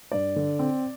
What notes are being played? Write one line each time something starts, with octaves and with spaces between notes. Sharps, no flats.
G2 D5
D3
C4